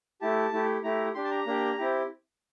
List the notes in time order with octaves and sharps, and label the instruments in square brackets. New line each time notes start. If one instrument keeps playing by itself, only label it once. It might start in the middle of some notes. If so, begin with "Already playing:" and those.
[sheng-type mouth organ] A3 E4 G4 A5
A3 E4 G4
A3 E4 G4 A#5
D4 G4 C6
A5
A#5
A#3 D4 G4
C4 E4 G4